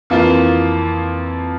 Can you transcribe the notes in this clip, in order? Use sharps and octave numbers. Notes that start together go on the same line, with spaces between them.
F2 E3 A#3 F4